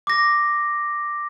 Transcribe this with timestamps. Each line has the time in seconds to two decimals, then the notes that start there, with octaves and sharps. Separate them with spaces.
0.07 D6 A#6